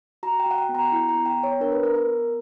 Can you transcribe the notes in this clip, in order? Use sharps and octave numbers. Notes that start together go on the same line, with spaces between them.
F#4 A#5
G5
F#4 F#5
G5
B3
A#5
E4
A#5
B3
G5
B3
C#5
D4 A#4
B4
B3 A#4
A#4
B3